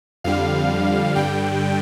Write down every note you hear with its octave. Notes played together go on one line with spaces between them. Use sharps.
F2 D3 G3 F5
G2 D3 G3 G5